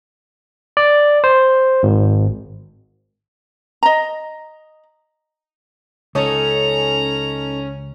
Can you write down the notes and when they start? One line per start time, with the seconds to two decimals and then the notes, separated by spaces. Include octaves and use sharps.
0.77 D5
1.24 C5
1.83 G#1
3.83 D#5 A#5
6.15 C#2 C#4 D#4 A4 C#5 A#5